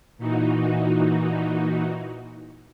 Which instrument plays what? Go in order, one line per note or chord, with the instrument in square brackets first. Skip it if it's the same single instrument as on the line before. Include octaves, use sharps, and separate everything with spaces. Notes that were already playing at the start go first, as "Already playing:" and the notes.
[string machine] A#2 E3 D#4 F#4